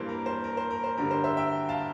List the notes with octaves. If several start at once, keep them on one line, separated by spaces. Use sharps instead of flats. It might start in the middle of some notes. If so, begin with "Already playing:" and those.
Already playing: G2 E3 G3 A#3 C5
A#4
C5
A#4
C5
A#4
C5
G2 D3 G3 A#4
C5
C5 E5
E5 G5
F5 A5